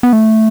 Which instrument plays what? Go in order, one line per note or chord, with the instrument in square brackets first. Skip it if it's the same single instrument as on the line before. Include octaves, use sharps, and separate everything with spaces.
[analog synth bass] B3
A3